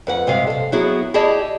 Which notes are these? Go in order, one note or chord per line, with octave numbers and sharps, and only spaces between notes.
F2 B4 F#5
G2 C3 G#3 G4 F5
A4 F5
F#3 B3 E4 F#4 G#4
E4 G4 G#4 D5 D#5 A5